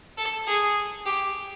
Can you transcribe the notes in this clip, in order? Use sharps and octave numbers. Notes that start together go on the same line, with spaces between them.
A4
G#4
G4